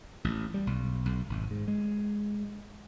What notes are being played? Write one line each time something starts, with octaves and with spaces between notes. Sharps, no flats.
A1
G3
B1
B1
G#1
G#2
G#3